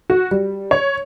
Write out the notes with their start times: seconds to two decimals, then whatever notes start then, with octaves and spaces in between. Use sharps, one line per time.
0.10 F#4
0.31 G3
0.71 C#5